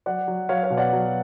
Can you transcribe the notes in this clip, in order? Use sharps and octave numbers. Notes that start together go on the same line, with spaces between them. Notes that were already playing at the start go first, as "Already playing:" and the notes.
F#3 D5 F#5
F#3
F#3 C#5 F5
C#5 F5
B2
D5 F#5
F#3